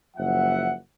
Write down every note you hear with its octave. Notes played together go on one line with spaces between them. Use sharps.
F#1 F3 E5 F#5